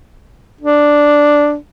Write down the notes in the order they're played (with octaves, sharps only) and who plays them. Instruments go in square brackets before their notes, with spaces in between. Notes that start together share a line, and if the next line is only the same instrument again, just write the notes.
[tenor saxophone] D4